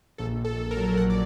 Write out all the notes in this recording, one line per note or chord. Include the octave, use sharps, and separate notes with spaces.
A#1 A4
A#1
A4
A#1
A#4
F#3
A#1 F#5
D5